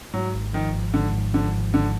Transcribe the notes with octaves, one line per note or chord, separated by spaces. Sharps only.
G#2 F#3
G#1
D#3 F3
G#1
G#2 D3
G#1
D3 F3
G#1
G#2 D3